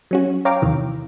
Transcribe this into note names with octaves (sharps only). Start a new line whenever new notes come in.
F#3 C#4 F#4
C#5 F5 G5 A#5 D6
E2 C3 D#3 E3